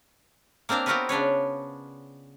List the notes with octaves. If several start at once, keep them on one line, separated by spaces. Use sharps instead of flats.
A#3 C4 D4 F5 A#5
B3 C4 F4 F#4 A#4 B4
C#3 D4 B4 C#5